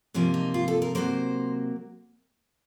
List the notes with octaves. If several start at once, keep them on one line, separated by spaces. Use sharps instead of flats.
C3 F3 A#3 C#4
D#4
F4
A4
A#4
C3 F#3 A#3 C5